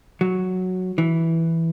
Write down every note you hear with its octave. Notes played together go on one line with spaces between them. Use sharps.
F#3
E3